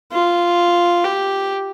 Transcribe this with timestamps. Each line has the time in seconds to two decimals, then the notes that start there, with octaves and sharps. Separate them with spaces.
0.12 F4
1.04 G4